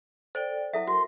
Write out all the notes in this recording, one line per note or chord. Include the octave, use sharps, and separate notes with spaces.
A4 C5 D5 G5
F#3 E4 A4 E5
F#4 A#4 C6